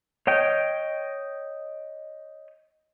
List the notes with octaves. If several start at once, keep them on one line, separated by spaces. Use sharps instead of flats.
C#5 D#5 G5